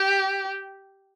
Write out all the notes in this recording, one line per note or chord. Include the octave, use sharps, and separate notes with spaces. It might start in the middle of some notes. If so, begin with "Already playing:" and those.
Already playing: G4